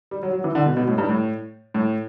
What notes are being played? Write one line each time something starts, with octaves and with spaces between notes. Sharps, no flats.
G3
F#3
F#3
E3
D3
B2
B2
A2
G2
A2
A2